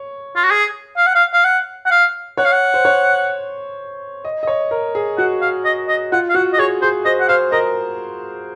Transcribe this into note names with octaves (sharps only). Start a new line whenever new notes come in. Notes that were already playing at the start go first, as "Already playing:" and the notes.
Already playing: C#5
F4
F#4
G#4
F5
F#5
F5
F5
F#5
F#5
F5
C#5 F#5
F5
F#5
C5
C#5
D#5
D#5
C#5
A#4
G#4
F#4 F#5
F5
D#5
D#5
F4 F#5
F5
F#4 F#5
D#5
G#4 C#5
G#4 C5
C5 D#5
F#5
C5 F5
A#4 D#5